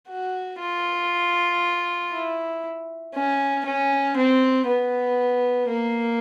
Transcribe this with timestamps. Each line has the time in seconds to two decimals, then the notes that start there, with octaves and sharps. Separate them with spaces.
0.09 F#4
0.60 F4
2.12 E4
3.14 C#4
3.65 C#4
4.16 C4
4.66 B3
5.68 A#3